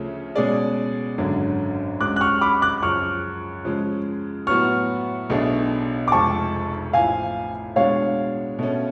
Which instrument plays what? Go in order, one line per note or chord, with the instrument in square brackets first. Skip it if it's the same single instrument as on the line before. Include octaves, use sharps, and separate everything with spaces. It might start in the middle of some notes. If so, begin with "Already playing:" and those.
Already playing: [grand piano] D2 C#3 F3 A3 C#4
B2 G#3 C#4 G#4 D5
G#1 F#2 D3 F#3
[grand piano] C#2 C#3 F#3 [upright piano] D6 F#6
[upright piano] F#6
C#6 F6
B5 D6
D6 F#6
[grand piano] F#2 C#3 F3 [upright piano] C#6 F6
[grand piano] C#3 F3 G#3
[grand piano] A2 F#3 B3 F#4 [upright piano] C#6 F6
[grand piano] B1 B2 A3 D4 G#4
[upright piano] D6
[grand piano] F1 F2 F3 G#3 [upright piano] A5 C#6
[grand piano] A1 A2 F3 [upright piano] F5 G#5
[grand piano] B2 G#3 D4 F#4 [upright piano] C#5 F5
[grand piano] B2 A3 C#4